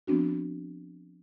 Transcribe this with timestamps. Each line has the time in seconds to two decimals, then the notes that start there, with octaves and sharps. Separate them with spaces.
0.07 F3 B3 C4 D4 F#4